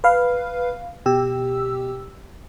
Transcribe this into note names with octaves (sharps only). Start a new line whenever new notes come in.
B4 F5
B2 G4 E6